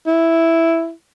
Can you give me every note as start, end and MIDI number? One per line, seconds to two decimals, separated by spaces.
0.07 0.91 64